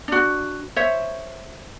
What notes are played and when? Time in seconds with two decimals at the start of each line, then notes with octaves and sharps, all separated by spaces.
0.08 D4 F#4
0.76 C5 C#5 E5